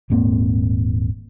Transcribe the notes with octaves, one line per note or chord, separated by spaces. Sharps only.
D#1 G#2 A#3 C4